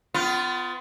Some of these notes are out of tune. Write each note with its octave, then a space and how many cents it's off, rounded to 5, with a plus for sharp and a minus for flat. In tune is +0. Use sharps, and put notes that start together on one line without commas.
B3 +35 F4 +0